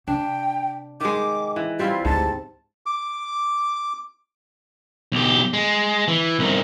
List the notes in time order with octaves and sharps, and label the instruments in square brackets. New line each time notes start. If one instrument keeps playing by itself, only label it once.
[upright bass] C3 [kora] D4 [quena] G5
[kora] D#3 G#3 [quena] D6
[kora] E3
[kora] G3 C4 E4 [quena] F4
[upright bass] D2 [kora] G#2 [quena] A5
[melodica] D6
[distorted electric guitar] B1 G4
G#3
E3
C2 D#3